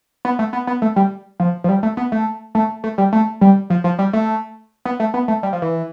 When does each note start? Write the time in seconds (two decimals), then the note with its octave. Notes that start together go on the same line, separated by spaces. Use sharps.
0.25 B3
0.39 A3
0.53 B3
0.67 B3
0.82 A3
0.96 G3
1.40 F3
1.64 F3
1.69 G3
1.83 A3
1.97 B3
2.12 A3
2.55 A3
2.84 A3
2.98 G3
3.13 A3
3.41 G3
3.70 F3
3.84 F3
3.99 G3
4.13 A3
4.85 B3
5.00 A3
5.14 B3
5.28 A3
5.43 G3
5.53 F3
5.62 E3